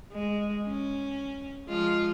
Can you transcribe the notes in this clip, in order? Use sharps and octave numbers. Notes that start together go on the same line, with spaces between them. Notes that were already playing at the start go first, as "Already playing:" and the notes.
G#3
C#4
F3 G#3 F4